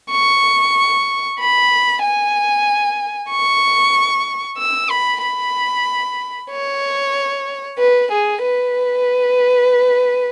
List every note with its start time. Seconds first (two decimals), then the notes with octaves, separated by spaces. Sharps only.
0.11 C#6
1.39 B5
2.02 G#5
3.30 C#6
4.58 E6
4.90 B5
5.23 B5
6.51 C#5
7.79 B4
8.11 G#4
8.42 B4